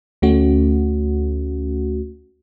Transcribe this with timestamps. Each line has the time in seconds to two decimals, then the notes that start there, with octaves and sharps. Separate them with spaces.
0.22 D2 A3 C#4 F#4